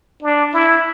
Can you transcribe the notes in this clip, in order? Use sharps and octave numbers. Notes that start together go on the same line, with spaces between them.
D4
E4